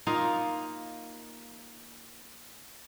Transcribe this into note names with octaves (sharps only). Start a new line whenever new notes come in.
A#3 D#4 F4